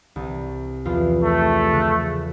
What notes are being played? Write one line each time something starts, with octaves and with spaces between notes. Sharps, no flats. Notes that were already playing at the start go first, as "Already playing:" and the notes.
C2
E2 F3 F4
A3
C#3 F#6 A6